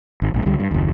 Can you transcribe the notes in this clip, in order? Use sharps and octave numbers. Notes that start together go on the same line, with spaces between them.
G#1
A#1 G#2
C#2 D3 G3
G2
F#1 D#2